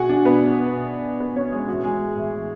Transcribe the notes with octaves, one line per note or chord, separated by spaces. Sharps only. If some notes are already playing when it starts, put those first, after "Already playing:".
Already playing: B2 F#4 G#4 F#5 G#5
D4 D5
B2 B3 B4
B2
B2 B3 B4
C#4 C#5
G#3 G#4
A2 E3 F#4
G#3 G#4
A2 E3